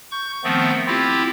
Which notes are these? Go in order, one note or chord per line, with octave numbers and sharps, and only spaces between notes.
C#6 G6
D#3 F3 A3 B3 C4
C4 E4 F4 G4